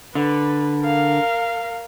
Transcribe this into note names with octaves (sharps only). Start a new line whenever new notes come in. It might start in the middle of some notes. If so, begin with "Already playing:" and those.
D3 B4
A#4 F5